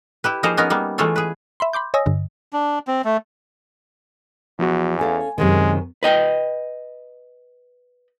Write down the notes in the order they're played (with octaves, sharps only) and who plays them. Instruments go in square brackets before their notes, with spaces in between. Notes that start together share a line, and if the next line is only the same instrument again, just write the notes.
[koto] E4 G4 B4
F3 A#3 D#4 G#4 A#4 C5
B3 C#4 D#4 A#4
G3 A#3 B3
E3 G#3 A3 F4 A4 C#5
G#4 B4
[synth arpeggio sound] E5 B5 C6
B5 C6 D6 G6
C#5 D#5 G#5 D#6 E6 A#6
G2 D3
[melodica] D4
C4
A3
[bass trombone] E2 [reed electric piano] F3 B3 F#4
[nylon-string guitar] C#4 A4 F5 [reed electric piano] G#5
[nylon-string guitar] F#2 C3 D#3 [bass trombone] G#3
[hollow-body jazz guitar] B4 D#5 G5